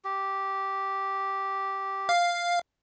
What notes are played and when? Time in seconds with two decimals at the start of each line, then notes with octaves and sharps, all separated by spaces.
0.05 G4
2.09 F5